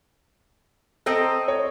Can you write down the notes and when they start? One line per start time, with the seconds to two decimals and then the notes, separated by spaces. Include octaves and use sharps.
1.06 C4 A4 D#5 A#5
1.48 C#5